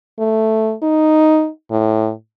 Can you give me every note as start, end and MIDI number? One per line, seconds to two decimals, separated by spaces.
0.19 0.73 57
0.82 1.49 63
1.71 2.11 45